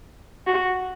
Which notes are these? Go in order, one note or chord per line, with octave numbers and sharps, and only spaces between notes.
F#4